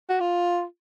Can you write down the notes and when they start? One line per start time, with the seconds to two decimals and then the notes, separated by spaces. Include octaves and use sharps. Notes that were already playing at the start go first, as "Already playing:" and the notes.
0.09 F#4
0.20 F4